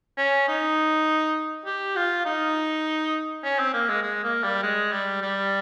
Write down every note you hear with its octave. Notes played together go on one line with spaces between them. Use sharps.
C#4
D#4
G4
F4
D#4
C#4
C4
A#3
G#3
G#3
A#3
G3
G#3
G3
G3